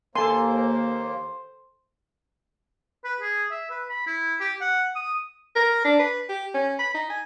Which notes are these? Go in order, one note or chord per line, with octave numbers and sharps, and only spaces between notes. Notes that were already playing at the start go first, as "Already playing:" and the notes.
D#2 A#3 A4 C5 G#5 A5 C6
B4
G#4
E5
B4
B5
E4
G4
F#5
D#6
A#4
D4
B4
G4
C#4
B5
D#4
G#5